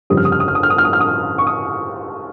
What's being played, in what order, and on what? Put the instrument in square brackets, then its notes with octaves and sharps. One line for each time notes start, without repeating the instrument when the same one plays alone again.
[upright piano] G1 F2 C#3 G3 D#6
F6
D#6
F6
D#6
F6
D#6
F6
D#6
F6
D#6
F6
D#6
C#6
D#6